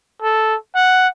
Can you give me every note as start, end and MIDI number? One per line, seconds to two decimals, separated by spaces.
0.22 0.56 69
0.75 1.08 78